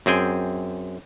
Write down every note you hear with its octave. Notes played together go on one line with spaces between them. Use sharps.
F#2 C4 G#4 G5